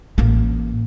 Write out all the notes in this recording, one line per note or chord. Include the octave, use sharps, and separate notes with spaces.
A1 A#3